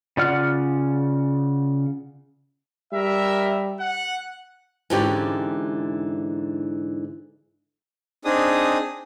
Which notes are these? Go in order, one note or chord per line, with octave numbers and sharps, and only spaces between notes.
C#3 F4 D5 F#5 F6
G3 A#4 E5
F#5
G#2 D3 E3 C#4 G4
C4 D4 D#4 G#4 D#6